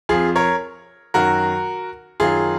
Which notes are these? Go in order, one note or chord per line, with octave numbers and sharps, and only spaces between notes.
F2 F3 F4 G#4
A#4 C#5
F#2 D#3 F#3 F#4 A#4
F#2 D#3 F#3 F4 G#4